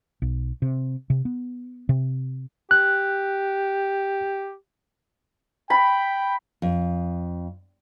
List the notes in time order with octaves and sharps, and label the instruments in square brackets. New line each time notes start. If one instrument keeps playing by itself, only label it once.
[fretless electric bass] B1
C3
C3
B3
C3
[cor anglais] G4 [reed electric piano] F#6
[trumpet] G5 [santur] B5
[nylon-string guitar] F2